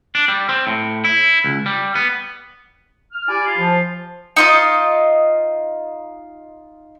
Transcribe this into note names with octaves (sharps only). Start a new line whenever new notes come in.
D4
G3
C4
A2
E4
C#2
G3
B3
F6
E4 G4 D5 G#5
F4
F3
D#4 F4 D#5